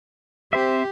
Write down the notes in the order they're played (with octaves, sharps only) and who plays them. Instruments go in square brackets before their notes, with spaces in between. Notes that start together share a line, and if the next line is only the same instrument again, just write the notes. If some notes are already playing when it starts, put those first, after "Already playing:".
[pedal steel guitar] C4 C5 E5 [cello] G4